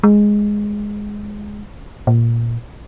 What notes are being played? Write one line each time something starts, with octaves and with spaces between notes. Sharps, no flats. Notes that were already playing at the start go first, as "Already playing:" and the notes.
G#3
A#2